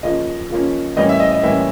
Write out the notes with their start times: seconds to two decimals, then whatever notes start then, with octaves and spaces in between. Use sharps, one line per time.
0.03 C#3 F3 A#3 C#4 D#5
0.50 C#3 F3 A#3 C#4
0.96 A2 E3 G3 A#3 C#4 D#5
1.09 E5
1.20 D#5
1.31 D#5
1.43 A2 E3 G3 A#3 C#4 E5